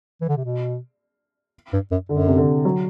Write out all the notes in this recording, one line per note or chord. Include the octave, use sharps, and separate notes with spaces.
E3
D3
C3
B2
G2
F#2
F#2 D3
C3
D3
F#3